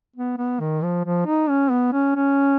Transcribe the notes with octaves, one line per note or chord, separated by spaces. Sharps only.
B3
B3
D#3
F3
F3
D#4
C#4
B3
C#4
C#4